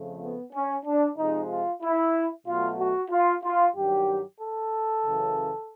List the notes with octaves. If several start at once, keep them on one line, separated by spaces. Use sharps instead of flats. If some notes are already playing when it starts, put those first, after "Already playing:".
Already playing: F2 C#3 F3 A3
B3
C#4
D4
C3 F3 G#3 D#4
F4
E4
B2 F#3 A3 F4
F#4
F4
F4
G2 D#3 F#3 G4
A4
F#2 C#3 E3